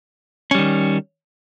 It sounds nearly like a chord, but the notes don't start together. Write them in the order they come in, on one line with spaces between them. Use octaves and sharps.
C#4 G3 D#3